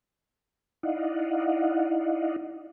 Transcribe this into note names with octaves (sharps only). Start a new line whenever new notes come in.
D#4 E4 D5 D#5 F5 F#5